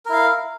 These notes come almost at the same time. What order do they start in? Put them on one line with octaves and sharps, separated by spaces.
A#4 E4 F5